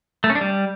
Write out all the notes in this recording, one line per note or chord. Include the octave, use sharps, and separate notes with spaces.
A3
C#4
D4
G3